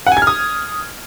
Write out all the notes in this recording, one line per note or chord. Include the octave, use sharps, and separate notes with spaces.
F#5
G#5
G#6
F6
D#6